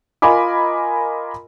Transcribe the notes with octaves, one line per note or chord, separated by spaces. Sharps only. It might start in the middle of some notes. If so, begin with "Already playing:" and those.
F4 A#4 D#5 G#5 B5 D6